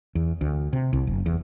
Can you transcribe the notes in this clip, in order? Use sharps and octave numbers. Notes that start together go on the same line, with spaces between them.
E2
D2
C3
C2
F#1
E2